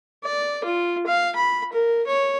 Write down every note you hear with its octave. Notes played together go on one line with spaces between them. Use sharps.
D5
F4
F5
B5
A#4
C#5